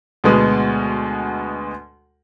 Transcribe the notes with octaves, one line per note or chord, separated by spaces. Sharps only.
D2 B2 G#3 B3